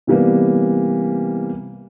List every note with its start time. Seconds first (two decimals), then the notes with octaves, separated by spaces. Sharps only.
0.07 C3 E3 G3 A#3 B3